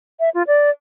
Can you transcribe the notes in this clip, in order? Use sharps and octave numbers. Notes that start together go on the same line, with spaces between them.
E5
F4
D5